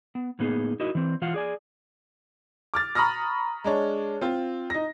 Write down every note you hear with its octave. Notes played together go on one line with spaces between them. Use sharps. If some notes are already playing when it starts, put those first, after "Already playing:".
B3
A2 A#3 B3 D#4 G#4
D#4 E4 F#4 A#4 D#5
E3 C4
E3 F4 F5 F#5
G#4 D5 G#5
D6 F6 A6
A#5 B5 C#6 D#6 F6 A#6
G#3 D4 C#5
C4 F4
D#4 A#6